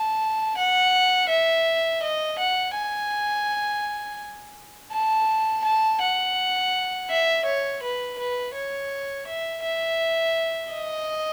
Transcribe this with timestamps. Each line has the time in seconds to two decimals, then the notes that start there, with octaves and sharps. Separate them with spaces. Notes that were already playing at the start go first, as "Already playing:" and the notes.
Already playing: A5
0.58 F#5
1.29 E5
2.03 D#5
2.39 F#5
2.75 G#5
4.92 A5
5.64 A5
6.01 F#5
7.10 E5
7.45 C#5
7.83 B4
8.19 B4
8.54 C#5
9.27 E5
9.63 E5
10.72 D#5